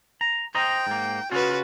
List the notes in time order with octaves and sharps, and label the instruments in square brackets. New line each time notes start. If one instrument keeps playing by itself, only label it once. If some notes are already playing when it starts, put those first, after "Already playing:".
[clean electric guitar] A#5
[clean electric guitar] C5 D#5 A#5 [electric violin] G5
[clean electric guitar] G#2 A#3
[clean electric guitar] C#3 C#4 F4 [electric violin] F#4 B4